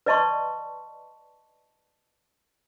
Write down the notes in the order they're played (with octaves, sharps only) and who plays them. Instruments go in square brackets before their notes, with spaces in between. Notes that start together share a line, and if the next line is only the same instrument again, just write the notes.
[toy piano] B4 D5 D#5 A5 C6 C#6